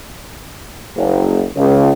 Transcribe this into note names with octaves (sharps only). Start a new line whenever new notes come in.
F#1
C#2